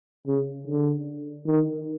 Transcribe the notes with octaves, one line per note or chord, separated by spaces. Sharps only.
C#3
D3
D#3